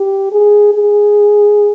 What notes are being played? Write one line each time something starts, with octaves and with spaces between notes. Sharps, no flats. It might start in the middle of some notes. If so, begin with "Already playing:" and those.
Already playing: G4
G#4
G#4